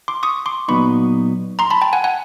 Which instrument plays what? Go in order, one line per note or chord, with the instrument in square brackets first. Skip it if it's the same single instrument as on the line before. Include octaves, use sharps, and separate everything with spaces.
[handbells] C6 D6
C#6 D#6
C6 D6
[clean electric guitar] A#2 F#3 B3 D#4 [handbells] B5 C#6
[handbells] A#5 C6
A5 B5
G5 A5
F#5 G#5
F#5 G#5